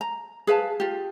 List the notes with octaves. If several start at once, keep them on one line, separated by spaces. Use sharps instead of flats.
A#5
G#4 B4 F5 A5
F4 G4